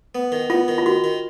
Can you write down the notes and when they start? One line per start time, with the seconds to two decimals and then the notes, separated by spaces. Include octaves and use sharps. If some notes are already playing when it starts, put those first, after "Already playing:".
0.15 B3
0.32 D#3
0.50 B3 F4
0.68 D#3
0.78 F4
0.86 D#3 F#4
1.04 D#3